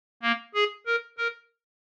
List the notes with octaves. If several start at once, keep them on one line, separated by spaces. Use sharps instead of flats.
A#3
G#4
A#4
A#4